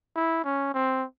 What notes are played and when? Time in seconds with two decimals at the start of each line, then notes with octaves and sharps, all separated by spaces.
0.16 E4
0.44 C#4
0.74 C4